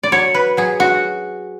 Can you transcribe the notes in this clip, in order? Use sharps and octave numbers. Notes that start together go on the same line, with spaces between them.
D5
F#3 C#5
B4
F#3 G#4
F#4